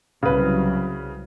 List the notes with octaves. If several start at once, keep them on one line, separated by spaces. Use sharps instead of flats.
C2 C#3 F#3 B4